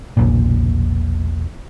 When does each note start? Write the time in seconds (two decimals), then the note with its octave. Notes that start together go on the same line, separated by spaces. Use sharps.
0.17 E1 A#1 A#2